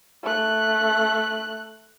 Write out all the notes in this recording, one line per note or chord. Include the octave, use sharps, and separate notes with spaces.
A3 F#6